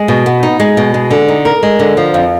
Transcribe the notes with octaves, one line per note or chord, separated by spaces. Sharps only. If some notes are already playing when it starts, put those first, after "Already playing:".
Already playing: G#3
B2
B3
D#4
G#3
B2
G#3
D3
D#4
A#4
G#3
D3
F3
F2